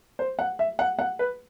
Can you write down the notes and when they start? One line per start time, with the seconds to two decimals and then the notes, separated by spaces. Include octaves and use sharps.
0.19 C5
0.39 F#5
0.59 E5
0.79 F#5
0.99 F#5
1.19 B4